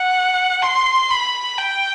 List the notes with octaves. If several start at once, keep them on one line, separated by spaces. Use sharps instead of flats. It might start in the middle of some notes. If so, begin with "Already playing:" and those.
Already playing: F#5
C6
B5
G5